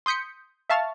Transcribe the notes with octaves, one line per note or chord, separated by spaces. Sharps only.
C6 D#6 G6 B6 C#7
E5 F5 A5 C#6 F6 A6